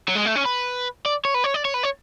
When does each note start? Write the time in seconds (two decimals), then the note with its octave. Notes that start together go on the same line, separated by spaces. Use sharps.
0.08 F#3
0.16 G#3
0.26 A3
0.36 C#4
0.46 B4
1.06 D5
1.25 C#5
1.34 B4
1.44 C#5
1.54 D5
1.65 C#5
1.74 B4
1.84 C#5